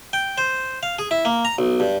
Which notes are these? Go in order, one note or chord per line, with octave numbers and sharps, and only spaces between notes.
G5
C5
F5
G#4
E4
A#3
A#5
B1
G2